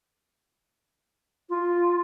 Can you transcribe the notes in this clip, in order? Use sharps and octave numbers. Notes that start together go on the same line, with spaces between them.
F4